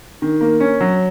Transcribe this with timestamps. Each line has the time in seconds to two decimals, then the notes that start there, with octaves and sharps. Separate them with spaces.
0.22 D#3
0.41 A#3
0.60 C#4
0.81 F#3